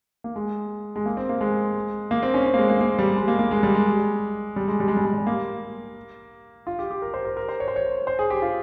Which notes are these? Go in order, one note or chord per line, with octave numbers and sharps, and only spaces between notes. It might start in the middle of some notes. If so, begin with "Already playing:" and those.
A#3
G#3
G#3
A#3
C4
A#3
G#3
A#3
C4
C#4
C4
A#3
G#3
A#3
A#3
G3
G#3
A#3
A#3
G#3
G3
G#3
G3
G#3
G3
G#3
G3
G#3
G3
A#3
F4
G4
G4
A#4
C5
A#4
A#4
C5
C#5
C5
C#5
C5
G#4
G4
F4